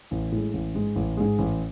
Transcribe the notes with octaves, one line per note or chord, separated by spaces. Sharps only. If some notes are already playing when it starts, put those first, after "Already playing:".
A1
A2 G#3
A1
G#2 G#3
A1
G#2 G#3
A1